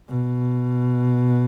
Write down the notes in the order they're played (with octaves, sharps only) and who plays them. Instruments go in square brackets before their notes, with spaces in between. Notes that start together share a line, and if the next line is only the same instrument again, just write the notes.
[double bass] B2